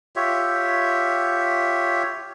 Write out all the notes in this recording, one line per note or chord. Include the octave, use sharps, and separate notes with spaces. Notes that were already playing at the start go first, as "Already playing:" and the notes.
F4 G4 C#5 E5